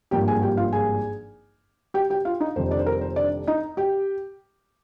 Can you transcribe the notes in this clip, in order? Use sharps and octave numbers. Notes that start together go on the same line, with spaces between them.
G#1 G2 F3 A#3 G4 G5
G#4 G#5
G4 G5
F4 F5
G#4 G#5
G4 G5
G4 G5
F4 F5
D#4 D#5
F1 F2 D#3 G3 C5
D4 D5
C5
A#4
C5
D4 D5
D#4 D#5
G4 G5